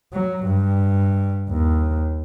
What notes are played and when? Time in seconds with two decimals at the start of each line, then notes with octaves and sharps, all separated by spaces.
0.13 F#3
0.44 G2
1.50 D#2